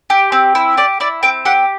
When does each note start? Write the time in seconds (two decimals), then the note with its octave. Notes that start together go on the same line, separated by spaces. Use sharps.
0.10 G4
0.32 C4
0.55 E4
0.77 G4 D5
1.00 E4 D5
1.23 C4 G5
1.45 G4 F#5